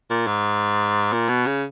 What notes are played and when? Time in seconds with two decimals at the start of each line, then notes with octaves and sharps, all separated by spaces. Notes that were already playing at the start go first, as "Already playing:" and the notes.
0.11 A#2
0.27 G#2
1.13 A#2
1.29 B2
1.46 C#3